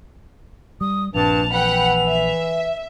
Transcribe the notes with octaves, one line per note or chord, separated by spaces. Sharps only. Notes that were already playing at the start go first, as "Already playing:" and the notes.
G3 D#6
A#1 G2 A#2 C4 A5 F7
E3 F#5 G5 B5
E5